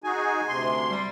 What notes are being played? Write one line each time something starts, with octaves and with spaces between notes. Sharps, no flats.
D#4 F#4 G#4 G#5
D2 C3 C6
G3